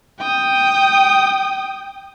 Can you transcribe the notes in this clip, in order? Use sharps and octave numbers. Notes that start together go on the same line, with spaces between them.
G5 D#6